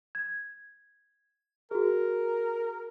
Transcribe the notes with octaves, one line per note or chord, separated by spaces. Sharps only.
G#6
F#4 G#4 A#4